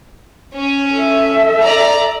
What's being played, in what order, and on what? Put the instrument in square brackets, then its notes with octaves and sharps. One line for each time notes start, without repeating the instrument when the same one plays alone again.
[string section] C#4
[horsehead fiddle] A4 E5
[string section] D5 A#5